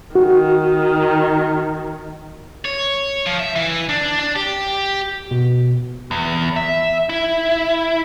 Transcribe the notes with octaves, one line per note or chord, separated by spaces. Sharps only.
D#3 F#4
C#5
F3
E5
E3
D4
D4
G4
B2
E2
E5
E4